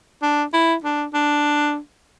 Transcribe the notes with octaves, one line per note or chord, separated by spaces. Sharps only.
D4
E4
D4
D4